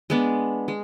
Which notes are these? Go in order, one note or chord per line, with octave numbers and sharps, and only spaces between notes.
G#3 B3 D4
G#3